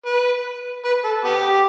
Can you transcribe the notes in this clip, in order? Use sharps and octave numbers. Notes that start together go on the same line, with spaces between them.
B4
B4
A4
B3 G4